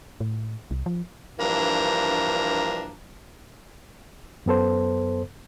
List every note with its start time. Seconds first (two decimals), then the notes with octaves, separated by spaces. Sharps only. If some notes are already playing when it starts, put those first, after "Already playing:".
0.20 A2
0.71 C2
0.86 F3
1.39 G2 E3 F3 A#3 D4 A#5
4.46 F#2 B3 A4 C5